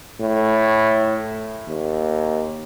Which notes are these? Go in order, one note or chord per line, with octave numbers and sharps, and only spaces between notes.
A2
D#2